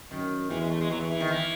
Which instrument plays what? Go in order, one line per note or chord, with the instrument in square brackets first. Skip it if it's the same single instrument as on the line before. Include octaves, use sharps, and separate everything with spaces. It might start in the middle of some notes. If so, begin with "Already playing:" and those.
[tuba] F#2 [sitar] D#3
[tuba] E2 [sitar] E3
[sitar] G#3
A3
G#3
[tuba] E2 [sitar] F#3
[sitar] E3
E3
D#3
E3